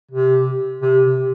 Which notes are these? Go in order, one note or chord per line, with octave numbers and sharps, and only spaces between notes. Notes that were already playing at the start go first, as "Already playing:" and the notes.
C3
C3
C3